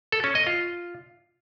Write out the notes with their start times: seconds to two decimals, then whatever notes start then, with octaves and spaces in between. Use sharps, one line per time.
0.12 A4
0.24 C#4
0.35 D#5
0.47 F4